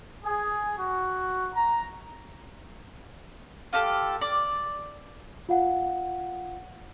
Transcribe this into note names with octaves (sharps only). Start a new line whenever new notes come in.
G#4
F#4
A#5
F4 G4 A4
D5
F4 F5 F#5